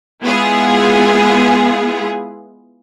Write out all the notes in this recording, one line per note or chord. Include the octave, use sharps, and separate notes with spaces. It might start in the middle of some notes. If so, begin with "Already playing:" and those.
G#3 B3 E4 F4 G#4